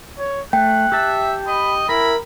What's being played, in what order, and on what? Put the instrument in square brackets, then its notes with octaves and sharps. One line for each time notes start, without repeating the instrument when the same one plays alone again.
[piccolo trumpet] C#5
[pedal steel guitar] A3 [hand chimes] G5 [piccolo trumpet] F#6
[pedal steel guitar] G4 A5 [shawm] E5
[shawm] D#5 [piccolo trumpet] B5
[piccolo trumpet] E4 [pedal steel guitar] A#4 [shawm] B5